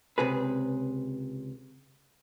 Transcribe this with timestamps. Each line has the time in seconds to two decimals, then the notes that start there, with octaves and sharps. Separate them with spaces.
0.18 C#2 C3 G#4 B4